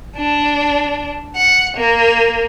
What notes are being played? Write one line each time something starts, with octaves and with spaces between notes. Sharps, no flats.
D4
F#5
A#3